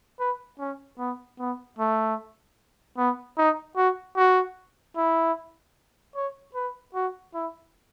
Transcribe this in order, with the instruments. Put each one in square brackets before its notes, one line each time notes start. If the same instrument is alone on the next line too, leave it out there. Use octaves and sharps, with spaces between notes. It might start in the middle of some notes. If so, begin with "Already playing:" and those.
[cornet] B4
C#4
B3
B3
A3
B3
D#4
F#4
F#4
E4
C#5
B4
F#4
E4